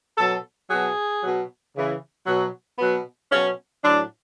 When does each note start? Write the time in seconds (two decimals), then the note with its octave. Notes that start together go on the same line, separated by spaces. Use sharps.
0.17 B2 F#3 A4
0.70 B2 F#3 G#4
1.22 B2 F#3
1.75 C#3 E3
2.27 B2 F#3
2.79 B2 F#3 B3
3.31 B2 F#3 C#4
3.83 A2 F#3 D4